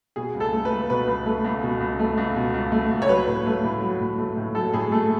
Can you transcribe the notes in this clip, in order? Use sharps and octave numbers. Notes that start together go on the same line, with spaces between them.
B2 G#4
C#2
A4
A3
B4
C#2
B2 B4
C#2
A3
C#2
B2
C#2
A3
C#2
B2
C#2
A3
C#2
C#5
F#3 B4
A2
A3
A2
F#3
A2
A3
A2
F#3 A4
A2 G#4
A3 A4